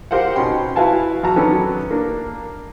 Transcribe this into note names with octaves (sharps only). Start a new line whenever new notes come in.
G4 A#4 C5 F5 F#5
B2 C#4 D#4 G5 C6
E4 F#4 B4 F5 G#5 A5
E2 F#3 F#4 A5 A#5
D#3 F#3 B3 C#4 D4 A4
A#3 D4